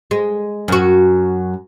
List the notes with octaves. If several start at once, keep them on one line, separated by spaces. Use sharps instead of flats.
G#3
F#2 F#4